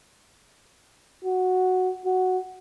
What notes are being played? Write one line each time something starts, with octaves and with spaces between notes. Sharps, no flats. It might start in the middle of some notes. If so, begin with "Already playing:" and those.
F#4
F#4